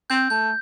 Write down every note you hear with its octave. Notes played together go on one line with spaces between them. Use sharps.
C4 G6
A3 G6